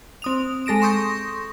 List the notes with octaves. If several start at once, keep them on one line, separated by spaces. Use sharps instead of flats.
C4 D#6 F7
G#3 A4 A#6 D7 E7
C6 C#6 D#6 G6 A#6